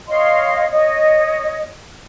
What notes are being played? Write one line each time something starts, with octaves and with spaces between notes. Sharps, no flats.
C#5 D#5 F5 C6
C#5 D#5